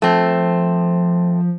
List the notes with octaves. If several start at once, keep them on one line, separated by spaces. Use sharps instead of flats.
F3 A3 C4